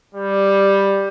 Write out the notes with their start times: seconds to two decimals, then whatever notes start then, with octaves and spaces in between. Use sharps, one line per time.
0.15 G3